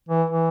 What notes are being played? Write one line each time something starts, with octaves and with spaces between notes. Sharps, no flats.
E3
E3